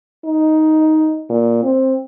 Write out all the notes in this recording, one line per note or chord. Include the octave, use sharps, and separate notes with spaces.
D#4
A#2
C4